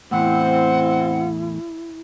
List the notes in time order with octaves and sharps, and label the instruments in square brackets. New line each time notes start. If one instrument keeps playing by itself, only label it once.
[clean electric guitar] E2 A2 [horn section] C4 [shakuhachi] E4 [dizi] F#5